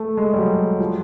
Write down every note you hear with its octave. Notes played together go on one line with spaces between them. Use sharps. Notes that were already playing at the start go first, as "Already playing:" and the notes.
Already playing: A3
G#3
G3
F#3
F3